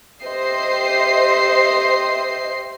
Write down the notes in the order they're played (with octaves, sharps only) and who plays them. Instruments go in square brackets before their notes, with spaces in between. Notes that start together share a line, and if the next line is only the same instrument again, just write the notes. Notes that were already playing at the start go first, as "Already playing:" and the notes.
[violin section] G4 C5 D#5 E5 C7